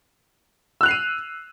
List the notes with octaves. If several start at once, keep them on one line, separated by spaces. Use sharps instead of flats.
E6 F#6 C7 D#7 F7